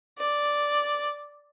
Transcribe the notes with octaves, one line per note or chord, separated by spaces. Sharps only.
D5